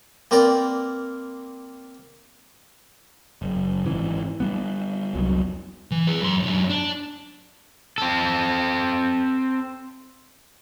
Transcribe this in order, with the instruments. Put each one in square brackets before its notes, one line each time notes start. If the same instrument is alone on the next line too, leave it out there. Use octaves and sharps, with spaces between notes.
[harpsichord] A#3 C4 A#4 B4 D5
[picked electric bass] F#1
G#1 E3
G3 B3
F1 C2 F#3
[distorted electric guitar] E3
G#4 B4
F#2 C6
F#2 D4
D4
[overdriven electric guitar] C4 A4